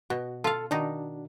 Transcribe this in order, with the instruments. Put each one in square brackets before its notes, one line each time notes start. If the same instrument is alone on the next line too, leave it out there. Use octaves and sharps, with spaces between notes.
[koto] B2 [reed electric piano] F#4
[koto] F4 F5 [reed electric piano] A4
[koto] D#3 D#4 [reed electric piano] D4 F#4